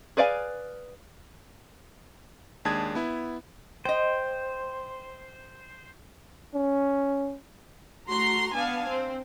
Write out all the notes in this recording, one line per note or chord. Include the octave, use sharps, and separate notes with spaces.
G#4 B4 D5 F5 G#5
D#2 G#3 D4 A5 D#6 G#6
B3 E4
C5 D#5 G5
C#4
A3 F#4 A#5 C6
B3 D4 F5 G#5 A5
C4